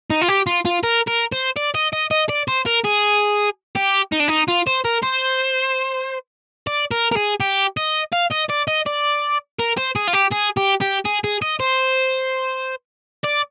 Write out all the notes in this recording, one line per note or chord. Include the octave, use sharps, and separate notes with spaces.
D#4
F4
G4
F4
F4
A#4
A#4
C5
D5
D#5
D#5
D#5
D5
C5
A#4
G#4
G4
D#4
D4
D#4
F4
C5
A#4
C5
D5
A#4
A#4
G#4
G4
D#5
F5
D#5
D5
D#5
D5
A#4
C5
G#4
F4
G4
G#4
G4
G4
G#4
G#4
D#5
C5
D5